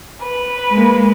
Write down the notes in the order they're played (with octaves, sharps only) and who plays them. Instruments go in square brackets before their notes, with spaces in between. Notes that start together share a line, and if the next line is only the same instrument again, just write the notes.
[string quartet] B4
[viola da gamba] G#3 A#3